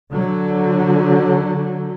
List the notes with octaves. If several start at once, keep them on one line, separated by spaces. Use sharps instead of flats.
D3 F#3